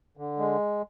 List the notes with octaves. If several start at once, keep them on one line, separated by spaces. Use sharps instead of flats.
D3
G#3